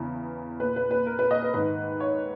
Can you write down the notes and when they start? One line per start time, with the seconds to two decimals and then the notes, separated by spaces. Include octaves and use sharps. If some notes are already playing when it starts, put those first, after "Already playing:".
Already playing: E2 C#3 E3
0.60 A#2 B4
0.76 B4
0.91 B4
1.06 A#4
1.19 B4
1.31 D#5
1.43 B4
1.54 G#2 D#3 B4
2.00 C#5